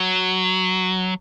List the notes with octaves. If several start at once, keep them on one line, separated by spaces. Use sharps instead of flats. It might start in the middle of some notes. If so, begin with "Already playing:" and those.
Already playing: F#3